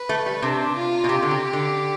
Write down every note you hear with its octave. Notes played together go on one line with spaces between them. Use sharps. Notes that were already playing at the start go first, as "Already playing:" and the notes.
Already playing: B4
A3
G3
C3 D4
F4
B2
C3 G4
D3
C3
D3